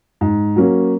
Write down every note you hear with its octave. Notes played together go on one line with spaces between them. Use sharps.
G#2
F#3 A#3 C#4